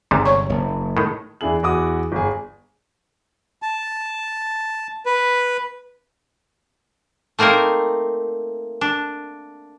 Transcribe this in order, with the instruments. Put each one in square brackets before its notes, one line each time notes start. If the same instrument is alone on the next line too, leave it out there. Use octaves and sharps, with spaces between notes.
[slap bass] G1 [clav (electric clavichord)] G#2 C3 G3
[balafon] C#5 C#6
[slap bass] F#1
[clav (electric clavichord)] A2 D#3
[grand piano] E2 D4 E4 G#4 F#7
E2 F#4 D6 D#6
G1 G#4
[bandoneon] A5
B4
[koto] A3 A#3 C4 D#4 A#4
D4